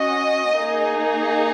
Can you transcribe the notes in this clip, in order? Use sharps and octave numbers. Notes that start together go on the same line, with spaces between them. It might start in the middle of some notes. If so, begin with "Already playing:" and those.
Already playing: C#4 F#4 D#5
A#3 D#4 G#4